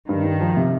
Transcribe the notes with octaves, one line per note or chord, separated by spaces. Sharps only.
G2 D#3
G2
F3
C3